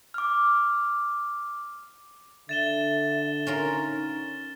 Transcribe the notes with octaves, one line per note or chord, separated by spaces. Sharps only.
D6 F6
D3 E5 A6 E7 G7
C#4 D#4 F4 A#4